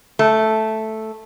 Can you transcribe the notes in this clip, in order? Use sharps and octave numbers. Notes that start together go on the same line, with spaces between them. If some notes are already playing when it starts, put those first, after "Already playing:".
A3